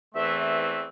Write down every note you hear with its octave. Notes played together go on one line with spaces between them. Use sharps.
E2 E3 A3 C4 E5
E5
E5